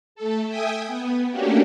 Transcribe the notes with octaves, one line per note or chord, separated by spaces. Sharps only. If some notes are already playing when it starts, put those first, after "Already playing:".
A3 A4
E5 G5 G#5 D#6
B3
A3 A#3 C#4 D4 F#4 G4